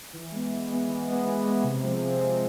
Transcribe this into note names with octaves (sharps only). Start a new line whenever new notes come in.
E3
G#3 B3
E3
G#3 B3
E3
G#3 B3
E3
G#3 B3
C3
F3 G#3 C4
C3
F3 G#3 C4